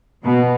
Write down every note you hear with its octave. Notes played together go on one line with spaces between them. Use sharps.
B2